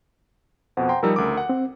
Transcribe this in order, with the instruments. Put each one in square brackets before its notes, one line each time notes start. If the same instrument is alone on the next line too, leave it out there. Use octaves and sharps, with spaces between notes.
[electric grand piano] F2 B2 [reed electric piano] C5 F#5
[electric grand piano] G5 A#5 C6
[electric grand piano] F3 G3 D#4 [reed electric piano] A#4 E6
[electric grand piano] D2 C#3 D6
F#5
[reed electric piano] C4